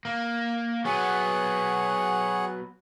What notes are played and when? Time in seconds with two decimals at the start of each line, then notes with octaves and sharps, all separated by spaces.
0.05 A#3
0.85 F#3 B3 G#4 C#5 F#5